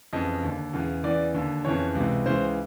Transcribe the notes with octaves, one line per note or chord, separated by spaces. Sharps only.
F2 C#3 E3 D#5
D#2 D3
E2 C#3 E3
E2 C#3 E3 D5
D#2 D3
F2 C#3 E3 C#5
C#2 C3 E3
C#2 C#3 E3 C5